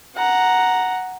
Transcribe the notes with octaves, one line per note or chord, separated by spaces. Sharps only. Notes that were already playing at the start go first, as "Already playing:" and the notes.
F#5 A#5